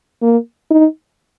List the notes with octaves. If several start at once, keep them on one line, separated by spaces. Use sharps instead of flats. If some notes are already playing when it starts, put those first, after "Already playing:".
A#3
D#4